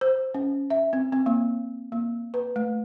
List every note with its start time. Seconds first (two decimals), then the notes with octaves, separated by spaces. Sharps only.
0.01 C5
0.34 C#4
0.70 E5
0.93 C4
1.12 C4
1.26 A#3
1.92 A#3
2.34 B4
2.56 A3